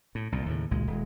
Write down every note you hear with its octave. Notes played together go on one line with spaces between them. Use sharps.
A2
C2 A#2
D#2 A2 C#3
G#1 C#2 A#2 G#3
D#1 G#3